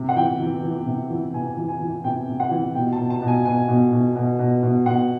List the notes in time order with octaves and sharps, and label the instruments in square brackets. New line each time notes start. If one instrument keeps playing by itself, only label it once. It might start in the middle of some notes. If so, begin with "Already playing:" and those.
Already playing: [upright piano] C3
F#5
E3 G5
E3
E3
C3
E3
C3 G#5
E3
G#5
E3
C3 G5
C3
F#5
E3
B2 G5
A5
B2
A5
B2
G#5
B2 G#5
B2
B2
B2
B2
B2
B2 F#5